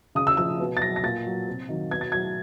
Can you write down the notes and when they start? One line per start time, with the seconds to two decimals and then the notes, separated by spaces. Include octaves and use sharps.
0.15 C#3 D#6
0.27 E6
0.37 F3 E6
0.60 B2
0.77 A6
0.82 F#3 A#6
0.96 A#6
1.03 A#2 A6
1.25 F#3
1.48 C3
1.69 D#3 F#3
1.91 B2 G#6
2.01 A6
2.12 F#3 G#6